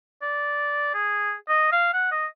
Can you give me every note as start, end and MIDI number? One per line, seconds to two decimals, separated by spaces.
0.22 0.90 74
0.94 1.33 68
1.49 1.71 75
1.72 1.89 77
1.93 2.10 78
2.12 2.26 75